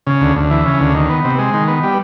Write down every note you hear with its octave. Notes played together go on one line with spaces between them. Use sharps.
C#3
D2
D2
E3
C#3
D2
D#3
B3
C3
G#3
D#3
B3
G3